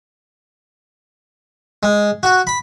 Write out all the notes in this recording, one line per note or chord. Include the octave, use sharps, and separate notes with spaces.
G#3
F#4
B5